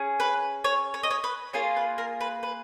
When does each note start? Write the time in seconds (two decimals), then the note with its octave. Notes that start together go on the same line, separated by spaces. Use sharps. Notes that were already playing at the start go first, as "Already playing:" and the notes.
Already playing: C#4 G#4
0.20 B4
0.64 C#5
0.94 C#5
1.03 D#5
1.11 C#5
1.24 B4
1.53 A#3 F4 G#4 C#5
1.76 B4
1.98 A#4
2.21 B4
2.43 B4